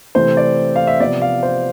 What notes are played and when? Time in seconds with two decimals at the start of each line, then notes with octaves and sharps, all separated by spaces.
0.15 C3 E3 A3 C4 C5
0.37 D5
0.76 F5
0.87 E5
1.00 C3 F3 B3 D5
1.22 F5
1.43 C5